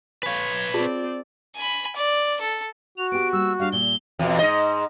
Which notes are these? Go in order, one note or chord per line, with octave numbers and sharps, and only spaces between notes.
B4 C#5 F5 G#5
C4 F4 G#4 D5 A5
G#5 B5
D5
A4
F#4 F7
B3 G4 D7
G3 A#3 E6
G3 D4 F5
A#2 G3 G7
E2 B2
G#2 D#5